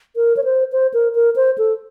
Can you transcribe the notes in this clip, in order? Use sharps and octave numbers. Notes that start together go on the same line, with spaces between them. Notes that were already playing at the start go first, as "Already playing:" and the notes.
A#4
C#5
C5
C5
A#4
A#4
C5
A4